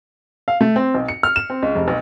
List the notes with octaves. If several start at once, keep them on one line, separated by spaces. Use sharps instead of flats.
F5
A3
C4
B1
C#7
F6
E7
C4
C#2
F1
B1